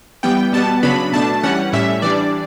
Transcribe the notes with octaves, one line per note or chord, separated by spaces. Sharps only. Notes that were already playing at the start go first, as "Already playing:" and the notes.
E3 G3 B3 G5
B2 G3 B3 A5
C#3 F#3 B3 D4 B5
B2 A3 D4 A5
E3 G3 C#4 F#5
A2 G3 C#4 E5
E3 G3 D4 D5